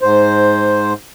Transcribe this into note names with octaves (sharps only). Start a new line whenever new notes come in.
G#2 C5